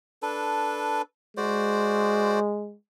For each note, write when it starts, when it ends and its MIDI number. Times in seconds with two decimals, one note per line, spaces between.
0.22 1.02 62
0.22 1.02 69
0.22 1.02 71
1.37 2.75 56
1.37 2.39 66
1.37 2.39 72
1.37 2.39 74